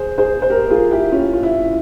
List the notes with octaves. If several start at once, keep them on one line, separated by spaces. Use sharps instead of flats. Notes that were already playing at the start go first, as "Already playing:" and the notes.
Already playing: G#4 C5
G#4 C5
C5
G4 A#4
F4 G#4
E4 G4
C#4 F4
F4
E4